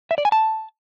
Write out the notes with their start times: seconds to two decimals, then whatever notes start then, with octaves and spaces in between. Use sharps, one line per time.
0.11 E5
0.18 D5
0.25 G#5
0.32 A5